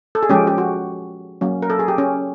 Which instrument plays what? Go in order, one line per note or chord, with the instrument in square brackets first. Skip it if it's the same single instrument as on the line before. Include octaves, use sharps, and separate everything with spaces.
[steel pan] A4
G#4
F3 G#3 C#4 G4
G4
F#4
F#3 A#3 C#4
A#4
A4
G#4
G4
C#4